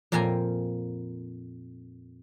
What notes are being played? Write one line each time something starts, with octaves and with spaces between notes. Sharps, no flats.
F2 A#2 A#3 G5 G#5 A#5